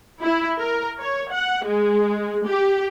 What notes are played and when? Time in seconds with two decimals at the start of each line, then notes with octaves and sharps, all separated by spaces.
0.23 E4
0.59 A#4
1.01 C#5
1.32 F#5
1.66 G#3
2.47 G4